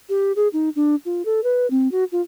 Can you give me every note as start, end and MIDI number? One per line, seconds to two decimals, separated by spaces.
0.09 0.32 67
0.36 0.48 68
0.53 0.69 63
0.76 0.95 62
1.05 1.22 65
1.25 1.43 69
1.43 1.69 71
1.70 1.91 60
1.92 2.04 66
2.12 2.21 65